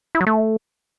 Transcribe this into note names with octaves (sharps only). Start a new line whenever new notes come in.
E4
F#3
A3